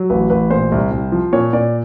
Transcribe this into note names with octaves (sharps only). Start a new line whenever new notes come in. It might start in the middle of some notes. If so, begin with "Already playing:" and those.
Already playing: F#3
A1 B4
A1 B4
A#2 C5
C2
C2
F3
A#2 C#5
A#2 D5